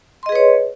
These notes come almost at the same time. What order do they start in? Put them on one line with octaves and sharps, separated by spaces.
C6 D#5 G#4 B4 C#5